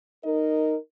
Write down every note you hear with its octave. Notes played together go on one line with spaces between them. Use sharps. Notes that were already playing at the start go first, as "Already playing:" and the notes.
D#4 A#4 D#5